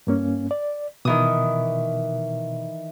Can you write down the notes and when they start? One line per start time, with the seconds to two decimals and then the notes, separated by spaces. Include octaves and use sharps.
0.07 G2 A#3 C#4
0.51 D5
1.05 B2 D#3 E3 D#6